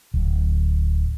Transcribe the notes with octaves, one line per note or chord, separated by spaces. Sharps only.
D1